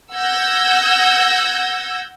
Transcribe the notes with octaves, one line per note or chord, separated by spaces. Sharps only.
F#5 E6 G6 G#6 A#6